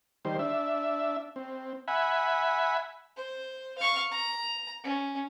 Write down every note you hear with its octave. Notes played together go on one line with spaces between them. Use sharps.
D#3 G3 C5
D4 E5
C4
E5 F#5 G#5 B5
C5
F5 C#6
A#5
C#4